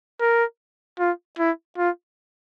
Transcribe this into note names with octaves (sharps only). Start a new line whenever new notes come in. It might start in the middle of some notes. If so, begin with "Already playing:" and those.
A#4
F4
E4
F4